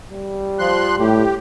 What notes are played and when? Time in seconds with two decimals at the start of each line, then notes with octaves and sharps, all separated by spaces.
0.12 G3
0.59 F3 C6 F#6
1.00 A2 G4